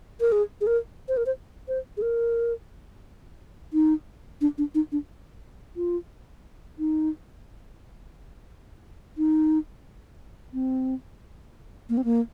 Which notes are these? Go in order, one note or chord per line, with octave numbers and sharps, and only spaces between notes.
A#4
G#4
G#4
A#4
C5
A#4
C5
C5
G#4
A#4
D#4
D4
D4
D#4
D4
F4
D#4
D#4
C4
A#3
C4
A#3